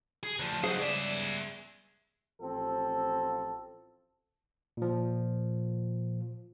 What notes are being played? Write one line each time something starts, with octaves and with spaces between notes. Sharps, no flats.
G#4
D2 F3
F#3 D#4 G#4 C5 F5
C#2 G2 G#4 D5 E5
A1 F3 C4 A4
A#2 F3